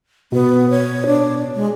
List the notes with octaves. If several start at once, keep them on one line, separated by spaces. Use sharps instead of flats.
B2 B3
C#5
D4
G#3